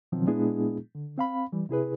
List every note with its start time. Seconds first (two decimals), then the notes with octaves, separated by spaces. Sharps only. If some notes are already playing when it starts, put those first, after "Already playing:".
0.12 B2 D#3 F3 F#3 C4
0.27 A#2 G#3 B3 D4 E4 G#4
0.95 D3
1.18 C4 F5 B5
1.53 E3 G3
1.69 C3 E4 G#4 B4